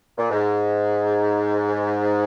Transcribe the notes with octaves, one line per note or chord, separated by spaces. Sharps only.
A#2
G#2